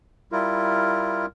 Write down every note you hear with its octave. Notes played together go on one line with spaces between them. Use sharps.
G3 E4 F4 A#4